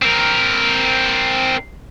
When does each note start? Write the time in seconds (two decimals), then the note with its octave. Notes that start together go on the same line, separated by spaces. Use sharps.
0.02 C4 A#4